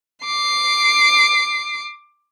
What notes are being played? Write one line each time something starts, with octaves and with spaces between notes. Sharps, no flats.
D6 C7